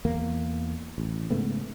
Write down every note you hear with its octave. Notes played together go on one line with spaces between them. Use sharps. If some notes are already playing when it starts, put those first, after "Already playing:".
E2 A#3
A1
G#2 C#3 A3 B3